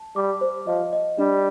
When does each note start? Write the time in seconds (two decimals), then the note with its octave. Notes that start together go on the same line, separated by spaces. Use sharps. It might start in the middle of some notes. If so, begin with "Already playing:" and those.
Already playing: A5
0.16 G3 D6
0.41 C5
0.67 F3 D#5
0.93 D#5
1.18 G3 D4